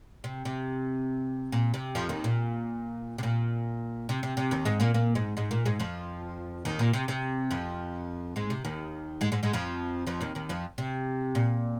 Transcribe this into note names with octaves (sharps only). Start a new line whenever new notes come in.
C3
C3
A#2
C3
F2 F3
D#2 D#3
A#2
C3
A#2
C3
C3
C3
D#2 D#3
G#2 G#3
A#2 A#3
A#2 A#3
G#2 G#3
G#2 G#3
A#2 A#3
G#2 G#3
F2 F3
D#2 D#3
A#2
C3
C3
F2 F3
G#2 G#3
C3
D#2 D#3
G#2 G#3
G#2 G#3
G#2 G#3
F2 F3
F2 F3
D#2 D#3
D#2 D#3
F2 F3
C3
A#2